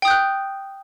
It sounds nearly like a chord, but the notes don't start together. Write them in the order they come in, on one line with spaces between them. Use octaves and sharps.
G5 D#6 G6 F#6